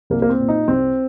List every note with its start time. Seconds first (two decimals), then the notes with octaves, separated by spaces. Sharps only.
0.10 C2 A#3
0.22 A#3
0.29 C4
0.40 A#2
0.49 D#4
0.68 C2 C4